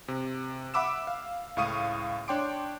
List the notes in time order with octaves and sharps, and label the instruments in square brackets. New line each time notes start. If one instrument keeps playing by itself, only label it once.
[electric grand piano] C3
E5 F#5 B5 D6 E6 E7
F5
C#2 A2 F5 C#6 D#6 D#7
D4 C#5 G5 C6 D6 D7